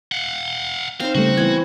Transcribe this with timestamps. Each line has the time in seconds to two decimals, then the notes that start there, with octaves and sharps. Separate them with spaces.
0.12 F5 F#5
1.00 C4 D#4 C5 F5
1.15 C#3 G3 A3 F#4
1.37 E3 B3 G#6